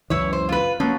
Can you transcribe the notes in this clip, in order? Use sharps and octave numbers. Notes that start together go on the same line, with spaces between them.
C#2 F#2 E3 E4 C#5
C5
F4 B4
F3 F#3 A#3 C#4